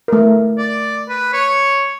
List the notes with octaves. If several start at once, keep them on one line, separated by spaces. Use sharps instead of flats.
A3 A#4
D5
B4
C#5